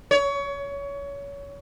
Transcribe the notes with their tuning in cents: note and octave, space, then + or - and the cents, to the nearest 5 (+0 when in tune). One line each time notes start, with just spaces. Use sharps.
C#5 +25